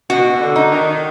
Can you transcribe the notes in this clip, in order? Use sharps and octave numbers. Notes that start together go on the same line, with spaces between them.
B2 F#4
B2
D3
D#4
D#3